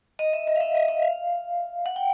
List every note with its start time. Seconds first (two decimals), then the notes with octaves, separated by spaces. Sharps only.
0.19 D#5
0.33 E5
0.47 D#5
0.56 F5
0.60 E5
0.75 D#5
0.88 E5
1.02 F5
1.86 F#5
1.96 G5